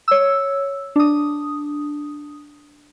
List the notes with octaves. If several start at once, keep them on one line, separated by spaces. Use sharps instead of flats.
C#5 E6
D4 D#6